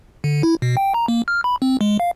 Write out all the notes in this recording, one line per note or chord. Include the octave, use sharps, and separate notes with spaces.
D3
E4
B2
G5
A#5
A#3
F6
B5
C4
G#3
F5